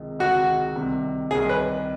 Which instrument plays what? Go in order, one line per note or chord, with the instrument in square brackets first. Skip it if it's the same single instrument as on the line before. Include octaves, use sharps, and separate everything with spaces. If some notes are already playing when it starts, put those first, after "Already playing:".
Already playing: [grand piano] C#2 C3 D#3 G#3
[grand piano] C#2 C3 D#3 G#3 [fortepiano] F#4
[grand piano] C2 C3 D#3
[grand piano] C2 C3 D#3 [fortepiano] G#4
[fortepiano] B4